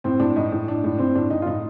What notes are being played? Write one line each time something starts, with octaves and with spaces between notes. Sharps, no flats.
A2 C4
A2 D4
A2 D#4
A2
A2 D4
A2
A2 C4
A2 D4
A2 D#4
F4
A2 D#4